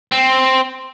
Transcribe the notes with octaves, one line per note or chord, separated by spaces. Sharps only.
C4